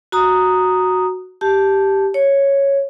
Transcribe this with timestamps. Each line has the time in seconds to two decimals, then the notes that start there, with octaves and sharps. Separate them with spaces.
0.12 F#4 A#5 D#6
1.41 G4 A5
2.14 C#5